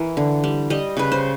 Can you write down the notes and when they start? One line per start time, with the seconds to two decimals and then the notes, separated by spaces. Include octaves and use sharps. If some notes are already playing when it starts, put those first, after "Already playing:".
Already playing: E3 A#4
0.17 D3
0.44 G3
0.70 G3 D#5
0.97 C#3 B4
1.12 C5